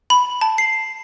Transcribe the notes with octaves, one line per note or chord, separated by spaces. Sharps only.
B5
A5
C7